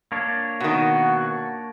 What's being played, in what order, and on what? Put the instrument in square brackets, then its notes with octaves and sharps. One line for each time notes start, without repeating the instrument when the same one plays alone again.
[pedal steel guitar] A#3 D4 C#5
[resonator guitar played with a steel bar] B2 D#3 [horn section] F#4